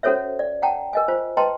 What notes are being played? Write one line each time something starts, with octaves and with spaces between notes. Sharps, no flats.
C#4 F#4 A4 C5 C#5 E5
D5
F#5 G5 A5 A#5
A#4 D#5 G#5
F4 C5
B4 D#5 G5 A5 A#5 C6